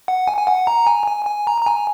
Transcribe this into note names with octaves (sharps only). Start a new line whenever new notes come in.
F#5
G#5
G#5
F#5
A#5
G#5
G#5
G#5
A#5
A#5
G#5